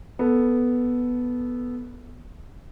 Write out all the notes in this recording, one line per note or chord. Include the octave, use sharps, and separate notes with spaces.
B3 A4